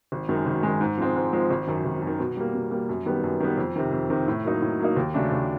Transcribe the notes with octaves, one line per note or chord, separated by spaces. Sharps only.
G#1
F#2 D#3 G#3
G#1
F#2 D#3 G#3
G#2
F3 G#3 C4
G#2
F3 G#3 C4
G#1
F#2 D#3
G#1
F#2
D#3
B2
G3 A#3
B2
G3 A#3
F#2
D#3 G3 B3
F#2
D#3 G3 B3
F2
C3 D#3
F2
C3 D#3
A2
F#3 A#3 D#4
A2
F#3 A#3 D#4
D#2
C#3 F#3 A3 D4
D#2